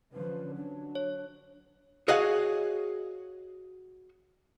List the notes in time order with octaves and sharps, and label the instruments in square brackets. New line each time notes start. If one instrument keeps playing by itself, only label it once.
[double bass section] D3 F3 C#4 [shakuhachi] B4
[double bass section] F#3 [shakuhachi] D4
[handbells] C#5
[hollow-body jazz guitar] F#4 G#4 C#5 D#5 F5 F#5